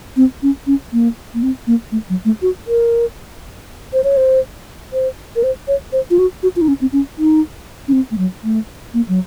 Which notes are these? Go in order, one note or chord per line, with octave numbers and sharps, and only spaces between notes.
C4
C#4
C#4
A#3
A#3
C4
A#3
A3
F#3
A3
F#4
A#4
C5
C#5
C5
C5
A#4
C5
C#5
C5
F4
F#4
F#4
F4
D#4
C#4
C4
C#4
D#4
C#4
C4
A3
F#3
A3
A#3
F#3